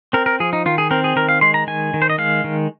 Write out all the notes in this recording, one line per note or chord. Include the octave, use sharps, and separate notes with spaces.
C4 A#4
A#4
F3 G#4
D#4
D#3 F4
G#4
C4 A#4
G#4
D#3 A#4
F5
G#3 C6
A#5
D#3 G#5
D#3
C5
D#5
G#3 F5
D#3